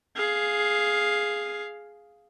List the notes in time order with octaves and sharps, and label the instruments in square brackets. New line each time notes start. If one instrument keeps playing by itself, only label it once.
[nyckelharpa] G#4 F5